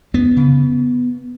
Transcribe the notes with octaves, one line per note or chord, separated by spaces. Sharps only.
F#2 B3
C#3